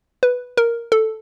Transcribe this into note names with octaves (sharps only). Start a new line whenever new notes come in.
B4
A#4
A4